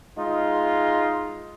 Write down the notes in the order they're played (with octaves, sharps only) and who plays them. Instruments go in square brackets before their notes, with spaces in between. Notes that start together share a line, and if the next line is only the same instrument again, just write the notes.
[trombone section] G#3 D#4 F4